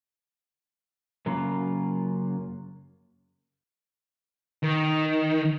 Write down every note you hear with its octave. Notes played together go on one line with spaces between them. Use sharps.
F#2 C#3 F#3 A#3 F4
D#3